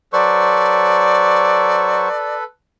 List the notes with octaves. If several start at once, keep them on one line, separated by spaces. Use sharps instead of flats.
F#3 A4 B4 C5 D5 C#6